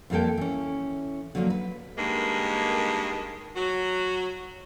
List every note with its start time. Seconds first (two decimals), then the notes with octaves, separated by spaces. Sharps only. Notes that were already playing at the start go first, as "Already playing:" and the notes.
0.10 F2 E3 G3 A#3 A4 G5
0.37 E3 C#4
1.35 D3 F3 F#3 G#3 A#3
1.50 B4
1.97 G2 D#3 G#3 A#3
3.56 F#3 F#4